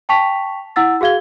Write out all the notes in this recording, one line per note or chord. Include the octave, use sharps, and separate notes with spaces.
G5 A5 C#6 B6 F7
E4 F#5 E6 A6
F#4 G#4 F5 G#6 G7